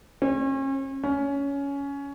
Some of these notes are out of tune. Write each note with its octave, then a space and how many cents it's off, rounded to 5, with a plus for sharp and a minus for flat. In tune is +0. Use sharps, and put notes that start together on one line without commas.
C#4 -40
C#4 +15